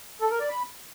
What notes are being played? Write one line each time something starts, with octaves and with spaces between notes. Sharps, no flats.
A4
A#4
D5
B5